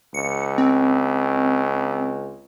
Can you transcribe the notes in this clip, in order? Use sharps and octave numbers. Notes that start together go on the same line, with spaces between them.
C#2 C#7
C4